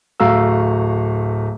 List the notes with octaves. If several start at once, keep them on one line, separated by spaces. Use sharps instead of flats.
D1 A3 F#4 F5 A#5 E6